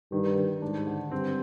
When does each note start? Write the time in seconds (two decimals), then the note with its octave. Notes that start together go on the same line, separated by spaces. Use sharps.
0.12 G2 D#3
0.37 D#3
0.62 G#2 D4
0.87 D3
1.11 G2 C4